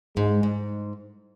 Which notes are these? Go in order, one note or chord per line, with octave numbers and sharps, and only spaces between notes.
G#2 G#3
G#2